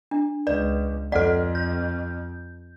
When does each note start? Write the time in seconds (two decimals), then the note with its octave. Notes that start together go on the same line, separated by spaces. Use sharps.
0.11 D4
0.47 C#2 B4 D5
1.12 F2 A4 D5 D#5 F#5
1.55 G6